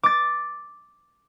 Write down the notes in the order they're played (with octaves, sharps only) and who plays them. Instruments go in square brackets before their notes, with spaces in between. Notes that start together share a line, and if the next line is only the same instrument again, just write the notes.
[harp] D6 A6